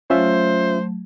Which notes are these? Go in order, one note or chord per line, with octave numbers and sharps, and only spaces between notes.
F#3 A3 C#4 F4 C5 E5